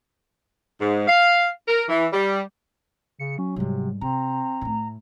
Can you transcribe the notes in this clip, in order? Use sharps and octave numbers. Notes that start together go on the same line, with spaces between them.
G#2
F5
A#4
E3
G3
C#3 C#7
F#3 C#4
G#2 C3 G3
C3 C4 A#5
A2 A3